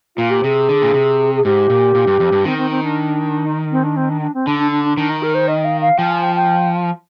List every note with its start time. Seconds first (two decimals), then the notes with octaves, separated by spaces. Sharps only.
0.16 A#2 F4
0.30 G4
0.44 C3 G#4
0.69 D3
0.82 A#2
0.94 C3
1.35 G#4
1.45 G#2 G4
1.70 A#2
1.95 A#2
2.07 G2
2.20 F2
2.32 G2
2.45 D#3 C4
2.58 C4
2.71 C4
2.83 D4
3.46 D#4
3.72 C4
3.84 D4
3.97 C4
4.09 D4
4.22 D4
4.34 C4
4.47 D3 D4
4.59 D4
4.72 D4
4.85 D4
4.97 D#3 D4
5.10 D#4
5.23 A#4
5.35 C5
5.48 D#5
5.65 F5
5.81 F5
5.98 F3 G5
6.11 G#5
6.23 G5
6.36 G5